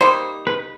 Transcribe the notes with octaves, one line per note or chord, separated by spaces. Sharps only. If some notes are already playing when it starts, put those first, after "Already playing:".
G3 A#3 D#4 C5
B4